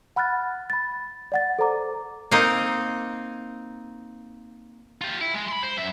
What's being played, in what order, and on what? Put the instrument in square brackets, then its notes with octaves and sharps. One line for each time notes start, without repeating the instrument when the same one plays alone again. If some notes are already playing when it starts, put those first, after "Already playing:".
[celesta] F#5 B5 F6 F#6 A6
B5 A6
D5 F#5 A6
A4 C5 A#5 D6
[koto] A#3 C4 D#4
[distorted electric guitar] F4 G4
E4
G#3
B5 C6
C5
F#2 E5